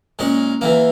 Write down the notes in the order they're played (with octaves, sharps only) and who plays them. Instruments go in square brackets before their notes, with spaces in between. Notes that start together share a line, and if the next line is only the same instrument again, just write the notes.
[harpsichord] A#2 G#3 C#4
E2 E3 A#3